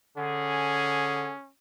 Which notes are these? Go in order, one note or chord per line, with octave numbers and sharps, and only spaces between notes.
D3 C#4 G#4